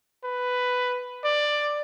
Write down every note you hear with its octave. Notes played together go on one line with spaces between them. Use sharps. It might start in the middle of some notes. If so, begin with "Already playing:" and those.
B4
D5